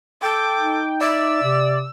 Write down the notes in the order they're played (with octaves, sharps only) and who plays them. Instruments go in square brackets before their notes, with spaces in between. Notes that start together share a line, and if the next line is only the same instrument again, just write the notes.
[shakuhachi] A4 [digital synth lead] G5 [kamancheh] D6
[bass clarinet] D#4
[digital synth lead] D5 [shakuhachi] E5 [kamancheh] E6
[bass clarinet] C3